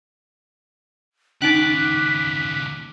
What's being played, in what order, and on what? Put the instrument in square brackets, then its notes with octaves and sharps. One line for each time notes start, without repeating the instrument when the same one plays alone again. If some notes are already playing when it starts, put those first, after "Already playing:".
[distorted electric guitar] D#2 C#3 [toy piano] C#4 D#4 [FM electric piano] D6 F#6 [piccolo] B6